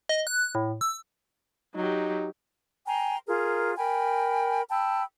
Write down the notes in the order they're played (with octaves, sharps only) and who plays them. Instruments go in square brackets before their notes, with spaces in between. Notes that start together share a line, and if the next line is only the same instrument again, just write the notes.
[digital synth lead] D#5
F#6
A2
E6
[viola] F#3 G4 [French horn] D#4
[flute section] G5 G#5 A#5 C6
F4 G#4 A#4
A#4 G5 G#5 B5
G5 A5 B5 E6